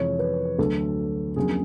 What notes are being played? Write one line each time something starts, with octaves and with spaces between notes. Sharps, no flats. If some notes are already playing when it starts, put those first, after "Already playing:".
Already playing: F2 C3 E3 G#3 C#5
B4
D2 D3 F#3 A4
F2 D3 F#3 A#3 C#4 G#4